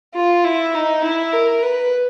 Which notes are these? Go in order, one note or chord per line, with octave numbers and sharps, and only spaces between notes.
F4
E4
D#4
E4
A#4
B4